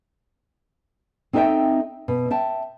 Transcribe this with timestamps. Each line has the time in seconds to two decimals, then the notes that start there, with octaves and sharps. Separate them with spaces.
1.33 C4 D#4 A4 D#5 E5 G5
2.08 B2
2.30 E5 G5 A5